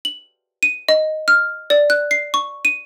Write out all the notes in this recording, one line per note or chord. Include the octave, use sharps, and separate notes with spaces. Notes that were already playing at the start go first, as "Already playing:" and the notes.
F#7
D#7
D#5
F6
D5
F#6
C7
C#6
D#7